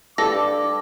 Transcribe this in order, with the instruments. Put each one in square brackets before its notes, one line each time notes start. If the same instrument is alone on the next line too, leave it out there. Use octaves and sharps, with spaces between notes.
[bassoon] G2 [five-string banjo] A4 [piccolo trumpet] D6 [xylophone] A#6